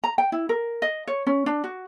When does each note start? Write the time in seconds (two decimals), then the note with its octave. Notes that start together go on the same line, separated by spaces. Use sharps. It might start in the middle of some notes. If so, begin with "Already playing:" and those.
0.04 A#5
0.18 G5
0.32 E4
0.49 A#4
0.82 D#5
1.07 C#5
1.27 C#4
1.46 D4
1.64 F#4